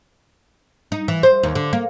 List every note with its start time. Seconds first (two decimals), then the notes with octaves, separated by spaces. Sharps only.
0.92 D#4
1.08 E3
1.23 C5
1.43 D#2
1.55 D3
1.73 A#3